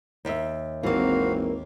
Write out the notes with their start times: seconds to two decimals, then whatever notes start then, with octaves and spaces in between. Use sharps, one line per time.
0.25 D#2 E5
0.83 G#1 E3 A#3 C4 F#4 F5